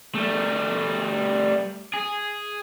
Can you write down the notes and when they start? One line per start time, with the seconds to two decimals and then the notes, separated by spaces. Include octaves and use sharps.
0.15 G3 A3
1.94 G#4